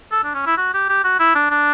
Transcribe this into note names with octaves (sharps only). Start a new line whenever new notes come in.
A4
D4
C#4
E4
F#4
G4
G4
F#4
E4
D4
D4